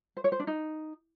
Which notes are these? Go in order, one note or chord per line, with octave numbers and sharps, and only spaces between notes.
C5
C#5
C5
D4
D#4